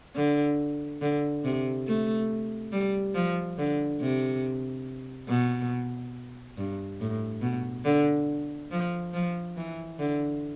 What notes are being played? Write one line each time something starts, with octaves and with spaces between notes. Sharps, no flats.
D3
D3
C3
A3
G3
F3
D3
C3
B2
G2
A2
B2
D3
F3
F3
E3
D3